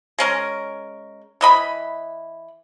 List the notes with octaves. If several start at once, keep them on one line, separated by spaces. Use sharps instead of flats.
G#3 C#4 A#4
E3 D#5 B5